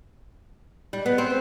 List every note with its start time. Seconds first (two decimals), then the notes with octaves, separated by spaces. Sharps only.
0.93 G3
1.06 B3
1.18 C4